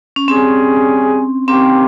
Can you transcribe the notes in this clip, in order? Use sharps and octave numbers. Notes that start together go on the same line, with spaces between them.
C#4
G3 C4 C#4 G#4
D#3 A#3 C4 C#4 G4